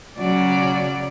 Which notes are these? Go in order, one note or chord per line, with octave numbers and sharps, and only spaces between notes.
C#3 F#3 D5